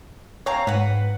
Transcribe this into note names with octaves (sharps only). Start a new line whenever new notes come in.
C4 C#5 F5 A#5
G#2 B4 F#5